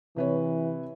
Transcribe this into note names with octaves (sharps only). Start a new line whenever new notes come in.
C3 E3 B4 C#5